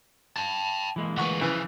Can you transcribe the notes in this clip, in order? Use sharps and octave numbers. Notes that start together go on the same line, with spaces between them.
G5 A5
E3 G#3 A#3
D2 B4 F#5 C#6
C#3 E3 F3 B4